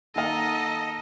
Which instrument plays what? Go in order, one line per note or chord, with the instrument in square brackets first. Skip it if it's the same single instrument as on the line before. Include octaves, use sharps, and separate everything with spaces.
[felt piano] D#3 A#3 F5 [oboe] A4 [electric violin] D#5 [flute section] F#5 A#5